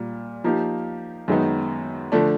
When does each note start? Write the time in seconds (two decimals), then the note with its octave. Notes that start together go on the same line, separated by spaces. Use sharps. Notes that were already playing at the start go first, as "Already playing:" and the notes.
Already playing: A#2 G3 A#3
0.44 F3 A#3 D#4 G4
1.28 F#2 D#3 G#3 B3 D#4
2.12 D3 F3 A3 D4